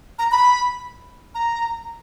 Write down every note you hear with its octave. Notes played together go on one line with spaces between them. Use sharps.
A#5
B5
A#5